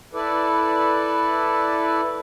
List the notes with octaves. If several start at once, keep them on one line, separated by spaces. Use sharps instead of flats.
E4 A4 B4 D5